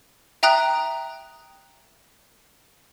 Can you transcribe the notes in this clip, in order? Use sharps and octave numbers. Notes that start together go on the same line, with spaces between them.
E5 G5 A#5 D#6 F#6